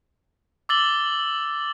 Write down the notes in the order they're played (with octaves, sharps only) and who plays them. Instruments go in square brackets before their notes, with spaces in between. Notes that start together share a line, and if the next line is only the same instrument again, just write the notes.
[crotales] D6 E6 A6 F#7 G7